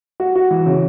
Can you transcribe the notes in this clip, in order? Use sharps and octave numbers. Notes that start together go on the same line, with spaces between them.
F#4
F#4
E3
C#3